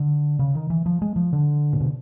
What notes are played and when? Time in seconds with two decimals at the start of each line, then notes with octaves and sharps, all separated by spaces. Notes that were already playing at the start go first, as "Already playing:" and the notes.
Already playing: D3
0.39 C#3
0.55 D#3
0.70 E3
0.86 F3
1.02 G#3
1.16 F3
1.33 D3
1.73 A#2
1.80 B2